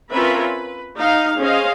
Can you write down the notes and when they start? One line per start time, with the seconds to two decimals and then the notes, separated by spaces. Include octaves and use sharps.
0.10 C4 C#4 F4 A#4 B4 E5
0.40 B4
0.97 D#4 F5
1.39 C#4 G#4 C5 D#5 F5